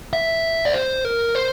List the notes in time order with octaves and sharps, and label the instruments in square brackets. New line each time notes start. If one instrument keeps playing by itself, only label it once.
[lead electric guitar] E5
D5
C5
A#4
C5